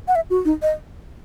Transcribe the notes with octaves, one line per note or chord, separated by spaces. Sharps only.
F#5
E5
F#4
D#4
D#5